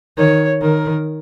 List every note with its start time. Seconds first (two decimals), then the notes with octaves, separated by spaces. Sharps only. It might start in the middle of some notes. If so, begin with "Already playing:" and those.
0.17 D#3 C#5
0.61 D#3 A#4